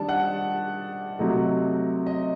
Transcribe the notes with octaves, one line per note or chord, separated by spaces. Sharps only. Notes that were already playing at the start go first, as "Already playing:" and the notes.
Already playing: D#3 G3 D4 A5
F#5
C3 F#3 A3 D#4
D#5